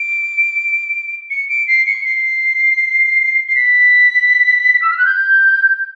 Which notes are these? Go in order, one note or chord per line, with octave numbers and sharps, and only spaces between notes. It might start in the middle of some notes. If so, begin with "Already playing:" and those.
Already playing: D7
C#7
D7
C7
C#7
C7
C7
B6
E6
F6
F#6
G6